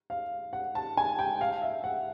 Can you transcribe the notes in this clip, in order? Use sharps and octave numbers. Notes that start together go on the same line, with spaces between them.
F5
F#5
A5
G#5
G5
F5
E5
F#5